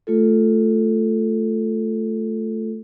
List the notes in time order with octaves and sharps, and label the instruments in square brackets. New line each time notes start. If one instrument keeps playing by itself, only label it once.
[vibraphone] A3 F4 A4